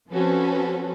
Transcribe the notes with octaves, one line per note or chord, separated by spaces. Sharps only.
F3 C4 C#4 F#4 A4 B4